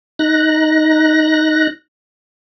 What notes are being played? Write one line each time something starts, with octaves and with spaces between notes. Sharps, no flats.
D#4 F#6 A#6